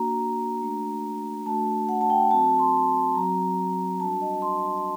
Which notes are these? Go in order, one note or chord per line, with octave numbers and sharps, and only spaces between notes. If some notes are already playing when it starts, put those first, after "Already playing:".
Already playing: A#3 D4 F#4 A#5
A3 D4 F#4
A3 D4 F#4 A5
F#5
A5
G5
F#3 C4 F#4 A5
C6
F#3 C4 F#4 A#5
G3 D4 F#4 A5
D#5
C6